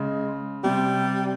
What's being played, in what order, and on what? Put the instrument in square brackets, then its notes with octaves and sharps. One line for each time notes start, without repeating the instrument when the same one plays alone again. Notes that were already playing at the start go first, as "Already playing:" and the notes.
Already playing: [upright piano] C#3 [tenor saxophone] G#3
[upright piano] C3 [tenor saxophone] G3